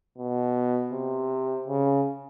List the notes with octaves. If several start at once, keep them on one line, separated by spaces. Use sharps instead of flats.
B2
C3
C#3